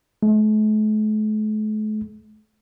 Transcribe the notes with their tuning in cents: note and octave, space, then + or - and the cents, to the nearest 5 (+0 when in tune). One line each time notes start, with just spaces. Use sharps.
A3 -45